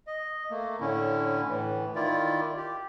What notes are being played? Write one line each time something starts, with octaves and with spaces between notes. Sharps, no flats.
D#5
A3 A#3
A2 D3 C#4 E4
A2 E3
D#3 E4 F4 D5
G4